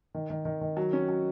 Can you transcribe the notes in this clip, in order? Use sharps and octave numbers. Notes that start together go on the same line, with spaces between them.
D#3
D#3
D#3
D#3
F#3
C#4
F#3